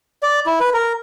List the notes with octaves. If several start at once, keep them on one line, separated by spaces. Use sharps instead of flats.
D5
E4
B4
A#4